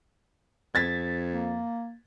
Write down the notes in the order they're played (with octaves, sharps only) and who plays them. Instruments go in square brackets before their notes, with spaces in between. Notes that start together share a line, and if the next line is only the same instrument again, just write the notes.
[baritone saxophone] F2 [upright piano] G#6 A6 B6
[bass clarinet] A#3